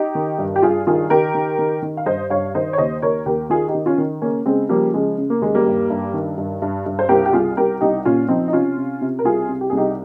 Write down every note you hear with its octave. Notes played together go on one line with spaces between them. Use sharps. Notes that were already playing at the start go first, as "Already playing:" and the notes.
Already playing: D#4 G4
D#3
G2
G4
G2 F4 G#4
D#3 F4 G#4
D#3 G4 A#4
D#3
D#3
D#3
F5
G2 C5 D#5
G2 C#5 F5
D#3 C5 D#5
C#5
D#2 C5 D#5
D#2 A#4 C#5
D#2 G4 A#4
D#3 F4 G#4
D#4 G4
D#3
C#4 F4
D#3
C#3 A#3 C#4
C#3 G#3 C4
F3 G3 A#3
C#3 G#3
C#3
A#3
D#2 G#3
G3 A#3
G2
G2
D#3
G2
G2
G2
C5
C2 G4 A#4
G4
C2 F4 G#4
C2 G4 A#4
C2 D#4 G4
A#2 C#4 F4
F3 C4 D#4
D#4
C3 C#4 F4
C3
C3
A#4
C2 F4 G#4
C3
G4
C2 G#4
D#4 G4